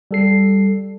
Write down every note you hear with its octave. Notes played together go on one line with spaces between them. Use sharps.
G3 A4 C7